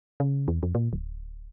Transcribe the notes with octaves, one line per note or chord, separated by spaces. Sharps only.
C#3
E2
F2
A#2
D1